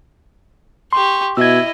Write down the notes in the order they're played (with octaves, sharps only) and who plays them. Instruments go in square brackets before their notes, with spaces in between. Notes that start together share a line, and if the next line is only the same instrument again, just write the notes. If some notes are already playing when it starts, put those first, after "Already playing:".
[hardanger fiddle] G4 C#6 [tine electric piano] C6
[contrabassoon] B2 [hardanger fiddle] E4 D#5 [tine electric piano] E6 G#6